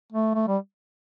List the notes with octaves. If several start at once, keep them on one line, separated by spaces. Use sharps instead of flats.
A3
A3
G3